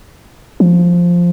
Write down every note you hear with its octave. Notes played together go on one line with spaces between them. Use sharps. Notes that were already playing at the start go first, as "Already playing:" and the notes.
F3